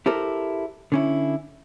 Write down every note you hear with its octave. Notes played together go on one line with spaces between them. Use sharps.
E4 G4 A4 A#4 C5
D3 C#4 E4